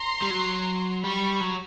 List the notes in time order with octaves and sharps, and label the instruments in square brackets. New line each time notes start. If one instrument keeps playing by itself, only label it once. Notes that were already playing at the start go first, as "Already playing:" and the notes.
Already playing: [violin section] A#5 C6
[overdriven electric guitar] G3
F#3
[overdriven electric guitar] G3 [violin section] B5 C#6
[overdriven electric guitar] F#3